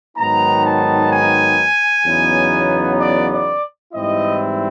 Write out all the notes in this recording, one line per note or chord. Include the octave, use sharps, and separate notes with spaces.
G#2 D#3 F#3 B3 D#4 A#5
A5
G#5
E2 C#3 F#3 B3 D#4
D5
D5
G#2 E3 G3 C4 E4 D#5